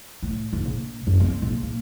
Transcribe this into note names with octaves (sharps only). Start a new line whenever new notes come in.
A2
F#1
A#1
F#2
C4
A#1
A#3